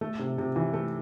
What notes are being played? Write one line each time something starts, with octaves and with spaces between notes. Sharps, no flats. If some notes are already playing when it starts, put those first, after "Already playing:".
A3
C3
C3
E3
A3